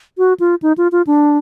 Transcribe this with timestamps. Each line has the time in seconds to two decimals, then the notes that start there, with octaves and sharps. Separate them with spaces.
0.18 F#4
0.40 F4
0.62 D#4
0.78 F4
0.92 F4
1.07 D4